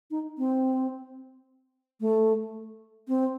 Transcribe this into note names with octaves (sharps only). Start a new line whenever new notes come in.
D#4
C4
A3
C4